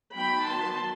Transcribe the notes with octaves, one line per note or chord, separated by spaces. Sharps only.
D#3 F#3 B3 G5 B5
A5 C6